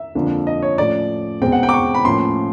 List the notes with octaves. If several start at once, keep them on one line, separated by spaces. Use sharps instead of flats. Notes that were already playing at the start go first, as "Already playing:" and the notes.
Already playing: E5
F2 D3 F3 A#3
D#5
C#5
A2 F3 A3 C#4 D5
E2 B2 G#3 C4 G5
F#5
G5
D6
C#6
B5
A2 F3 A#3 C#4 C6